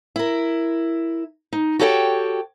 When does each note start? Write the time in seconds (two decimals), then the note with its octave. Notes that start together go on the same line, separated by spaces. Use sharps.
0.16 E4 A#4
1.53 D#4
1.79 F#4 G4 A4 C#5 F5 G5